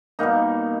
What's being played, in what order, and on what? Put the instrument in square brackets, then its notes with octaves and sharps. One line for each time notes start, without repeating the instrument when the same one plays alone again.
[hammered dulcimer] B2 G3 A#3 D#4